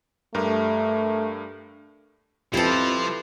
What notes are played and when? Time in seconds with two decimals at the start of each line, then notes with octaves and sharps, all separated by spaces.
0.35 G2 A3 G4 A#4
2.54 F2 F3 E4 G4 A4 B4 C5